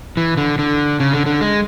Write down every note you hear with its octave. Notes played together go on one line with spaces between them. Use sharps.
E3
D3
D3
C#3
D3
D3
G#3